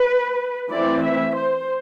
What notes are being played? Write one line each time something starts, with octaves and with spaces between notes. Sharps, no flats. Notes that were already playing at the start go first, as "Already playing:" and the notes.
Already playing: B4
E3 A3 C4 E4 D5
E5
C5